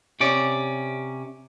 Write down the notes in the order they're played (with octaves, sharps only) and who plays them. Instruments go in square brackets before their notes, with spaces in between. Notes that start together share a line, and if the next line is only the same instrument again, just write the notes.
[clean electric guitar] C3 C#4 D5